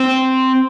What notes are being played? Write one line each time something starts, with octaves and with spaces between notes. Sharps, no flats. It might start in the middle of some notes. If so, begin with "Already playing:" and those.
Already playing: C4